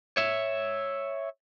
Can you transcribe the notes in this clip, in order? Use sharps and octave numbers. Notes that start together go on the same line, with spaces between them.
C#5 E5